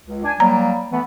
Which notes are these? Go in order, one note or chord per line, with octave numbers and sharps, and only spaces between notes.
C#2
D4 G#5
F#3 G3 A#3 A#5
E3 A3 B3